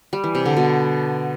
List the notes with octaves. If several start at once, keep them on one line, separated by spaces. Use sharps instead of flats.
G3
E3
C3
D3
B2